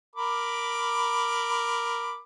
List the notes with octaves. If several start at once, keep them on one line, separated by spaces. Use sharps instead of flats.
A#4 B5 D6